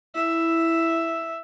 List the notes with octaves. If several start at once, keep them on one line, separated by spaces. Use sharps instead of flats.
E4 E5